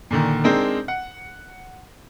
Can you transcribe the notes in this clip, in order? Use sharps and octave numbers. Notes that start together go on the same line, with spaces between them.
A#2 D3 D#3
G#3 C4 D4 D#4 A#4
F#5